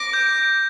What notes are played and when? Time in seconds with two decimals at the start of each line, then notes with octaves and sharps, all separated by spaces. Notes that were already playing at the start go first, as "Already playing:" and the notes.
Already playing: D6 A#6
0.13 G6